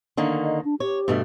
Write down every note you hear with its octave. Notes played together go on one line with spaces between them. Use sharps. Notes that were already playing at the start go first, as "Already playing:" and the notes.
D3 D#3 A#3
D#5
D4
G4 C#5
G2 B2 A3